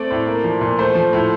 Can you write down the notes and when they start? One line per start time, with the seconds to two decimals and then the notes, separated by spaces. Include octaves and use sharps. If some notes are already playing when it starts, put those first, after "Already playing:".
Already playing: A3 C4 D5
0.11 A2
0.27 A#3
0.44 F3
0.61 A#2
0.79 A3 C5
0.95 F3
1.13 A2